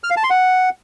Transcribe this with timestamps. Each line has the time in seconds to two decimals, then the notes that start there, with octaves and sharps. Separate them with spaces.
0.04 F6
0.10 F5
0.17 A5
0.24 C6
0.30 F#5